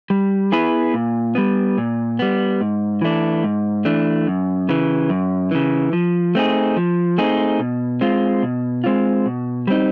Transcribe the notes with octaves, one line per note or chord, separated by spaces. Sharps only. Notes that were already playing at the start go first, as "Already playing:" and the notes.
G3
B3 E4 G#4 B4
A#2
G3 B3
A#2
G3 B3
G#2
E3 A3 D4
G#2
E3 A3 D4
F#2
C#3 E3
F#2
C#3 E3
F3
A3 C4 D#4 G#4
F3
A3 C4 D#4 G#4
B2
G#3 C4 F4
B2
G#3 C4 F4
B2
G3 C4 D#4